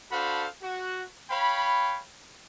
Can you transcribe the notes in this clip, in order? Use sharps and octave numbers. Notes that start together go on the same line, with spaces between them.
D4 F#4 A4 C5 F5 B5
F#4
C#5 F5 G5 B5